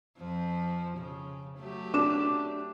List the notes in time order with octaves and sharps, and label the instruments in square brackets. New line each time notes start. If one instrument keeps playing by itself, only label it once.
[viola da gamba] F2 F3
C#3
F#3 A3 G4
[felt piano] D4 D6 E7